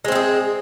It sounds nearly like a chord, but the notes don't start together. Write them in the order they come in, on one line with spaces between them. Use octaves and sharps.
G#3 C4 E4 G#4